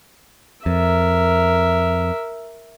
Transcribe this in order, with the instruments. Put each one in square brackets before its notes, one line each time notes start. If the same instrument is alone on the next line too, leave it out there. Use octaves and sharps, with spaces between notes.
[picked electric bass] F2 [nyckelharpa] A#4 E5